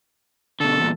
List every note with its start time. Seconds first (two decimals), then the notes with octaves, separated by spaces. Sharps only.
0.60 B2 D3 A4
0.79 E2 A#2